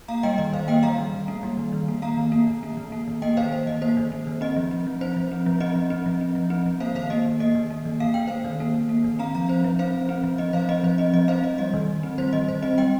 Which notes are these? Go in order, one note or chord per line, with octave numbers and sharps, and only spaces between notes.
A#3 F5 A#5
G3 D#5 G5
D#3 D#5
D#3 C5 F5
A#3 D#5 G5
G3 F5 A#5
D#3
D#3
A#3
G3
D#3
D#3
A#3
A#3 F5 A#5
D#3
A#3
D#3
A#3
D#3
A#3
D#3
A#3 D#5 G5
D#3 C5 F5
A#3 C5
D#3 D#5
A#3 C5
D#3
A#3
D#3
C4 D#5
F3
C4
F3
C4 C5
F3
C4
F3
C4 D#5
F3
C4
F3
C4
F3
C4
F3
A#3 C5 F5
D#3 C5 F5
A#3 D#5
D#3
A#3 D#5
D#3
A#3
D#3
A#3 F5
D#3 G5
A#3 C5 F5
D#3
A#3
D#3
A#3
D#3
C4 F5 A#5
F3 F5 A#5
C4 C5
F3
C4 C5 F5
F3
C4
F3
C4 D#5
F3 C5 F5
C4 D#5
F3 C5
C4 D#5
F3 D#5
C4 C5 F5
F3 D#5
G3 D#5
D#3
D#3
C4
G3 C5
D#3 D#5
D#3 C5
C4 D#5
G3 D#5 G5